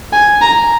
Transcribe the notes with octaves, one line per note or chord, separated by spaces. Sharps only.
G#5
A#5